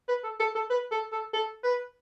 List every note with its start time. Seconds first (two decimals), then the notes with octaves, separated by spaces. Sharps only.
0.09 B4
0.24 A4
0.40 A4
0.55 A4
0.70 B4
0.92 A4
1.13 A4
1.33 A4
1.64 B4